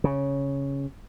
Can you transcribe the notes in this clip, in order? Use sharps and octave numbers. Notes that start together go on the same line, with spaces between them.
C#3